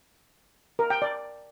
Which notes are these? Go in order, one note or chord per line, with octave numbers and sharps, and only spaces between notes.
A#4
G5
D5